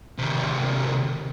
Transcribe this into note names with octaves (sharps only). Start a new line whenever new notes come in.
D#2 C3